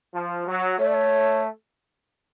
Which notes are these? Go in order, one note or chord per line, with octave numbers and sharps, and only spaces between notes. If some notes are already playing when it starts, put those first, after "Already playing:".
F3
F#3
A3 C#5
D5
C#5